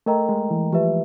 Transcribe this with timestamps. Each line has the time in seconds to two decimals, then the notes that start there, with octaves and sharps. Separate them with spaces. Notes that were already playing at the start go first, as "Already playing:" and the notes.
0.06 A3 A#4 D#5 G5 A#5
0.29 G#3
0.50 E3
0.72 F3 G4 B4 E5